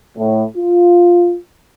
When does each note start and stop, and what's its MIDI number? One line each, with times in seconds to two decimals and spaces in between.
0.18 0.44 45
0.57 1.35 65